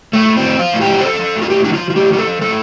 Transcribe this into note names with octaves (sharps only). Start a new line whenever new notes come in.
A2 A3
A2
C4
F3
F3 F4
A2
G4
F3
C5
F3 A4
F3
A2
F4
A2 G4
F3 D4
F4
F3
F4
A2 G4
F3 G4
A4
F3
A2 A4